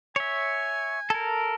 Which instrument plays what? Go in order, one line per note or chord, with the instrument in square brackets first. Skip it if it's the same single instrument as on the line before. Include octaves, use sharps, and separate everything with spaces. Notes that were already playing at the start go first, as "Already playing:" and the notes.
[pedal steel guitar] C#5 E5 [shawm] G#5
[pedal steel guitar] A4 A#4